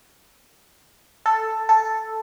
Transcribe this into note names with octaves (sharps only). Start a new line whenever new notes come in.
A4
A4